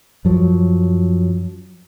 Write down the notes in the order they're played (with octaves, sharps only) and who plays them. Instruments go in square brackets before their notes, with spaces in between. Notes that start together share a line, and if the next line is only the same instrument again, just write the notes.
[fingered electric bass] F#2 F3 F#3